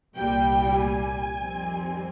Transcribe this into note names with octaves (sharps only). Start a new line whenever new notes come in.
C2 A#2 G3 G5
G#5
F2 D#3 G3 C4